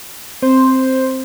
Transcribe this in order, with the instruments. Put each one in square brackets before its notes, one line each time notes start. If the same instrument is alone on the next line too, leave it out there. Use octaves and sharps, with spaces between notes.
[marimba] C4 [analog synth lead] C5